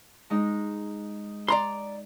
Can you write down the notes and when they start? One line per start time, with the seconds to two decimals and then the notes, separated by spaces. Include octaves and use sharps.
0.30 G#3 D#4
1.48 D5 A#5 C6